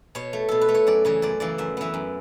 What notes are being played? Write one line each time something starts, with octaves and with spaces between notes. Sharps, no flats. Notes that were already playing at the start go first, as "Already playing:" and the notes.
B2 C#5
A3
B2 A4
B4
A3
C#5
F#2 D5
C#3 E3 C#5
F#2 D5
C#3 E3 D5
F#2 E5
E3 B3 E5
F#2